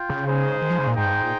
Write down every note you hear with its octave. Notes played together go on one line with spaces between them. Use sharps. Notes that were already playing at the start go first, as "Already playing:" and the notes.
Already playing: F4 G5
C#3
G#3 D#4 G#4 C5
D#3
F3
C#3
A#2
G#2 D#4 G#4 C5 G5
G2
G#2
A#2